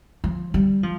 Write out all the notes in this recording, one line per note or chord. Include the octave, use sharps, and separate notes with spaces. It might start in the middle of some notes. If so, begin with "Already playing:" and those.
F3
G3
F3